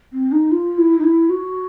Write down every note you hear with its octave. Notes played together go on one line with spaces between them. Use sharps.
C4
D#4
F4
E4
D#4
E4
F#4